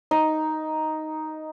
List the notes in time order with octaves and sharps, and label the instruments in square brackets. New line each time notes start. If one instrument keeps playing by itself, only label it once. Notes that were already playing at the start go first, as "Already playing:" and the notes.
[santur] D#4